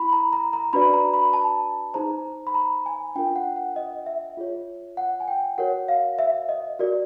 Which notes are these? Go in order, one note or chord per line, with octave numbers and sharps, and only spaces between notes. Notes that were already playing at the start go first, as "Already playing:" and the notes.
Already playing: E4 B5
A#5
A#5
A#5
D4 F#4 B4 D5 B5
A#5
B5
A5
D#4 G#4 C5 A#5
B5
A#5
G#5
D4 F4 A#4 G5
F#5
F#5
D#5
E5
F4 G#4 C#5
F#5
G#5
G5
F#4 A#4 C#5 F#5
F5
E5
D#5
F#4 A#4 D5